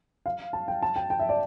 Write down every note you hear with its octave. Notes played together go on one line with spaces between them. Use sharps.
F5
A5
G5
A5
G5
G5
E5
D5